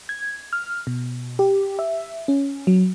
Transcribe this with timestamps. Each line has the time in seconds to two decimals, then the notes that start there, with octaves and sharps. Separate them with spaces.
0.09 G#6
0.53 F6
0.87 B2
1.39 G4
1.79 E5
2.28 C#4
2.67 F#3